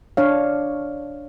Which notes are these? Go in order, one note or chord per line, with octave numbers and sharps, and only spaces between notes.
D4 C#5 F5